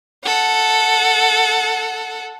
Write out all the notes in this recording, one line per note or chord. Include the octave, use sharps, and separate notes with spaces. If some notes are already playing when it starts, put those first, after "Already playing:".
A4 F#5